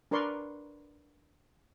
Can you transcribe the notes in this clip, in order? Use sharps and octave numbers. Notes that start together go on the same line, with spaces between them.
D4 A#4 B4 D5 C6 C#6